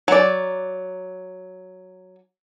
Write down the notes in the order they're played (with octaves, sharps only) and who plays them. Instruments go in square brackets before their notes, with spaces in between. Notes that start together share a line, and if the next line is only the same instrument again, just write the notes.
[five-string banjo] F#3 D5